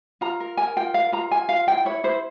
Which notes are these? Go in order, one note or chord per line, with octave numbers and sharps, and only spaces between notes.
F4 A#5
A#4
A#4 G#5
F4 G5
A#4 F5
F4 A#5
F4 G#5
F4 F5
E4 G5
E4 C#5
E4 C5